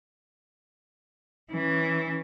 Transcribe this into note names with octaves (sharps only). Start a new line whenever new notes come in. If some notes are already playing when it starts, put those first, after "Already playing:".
E3 C#4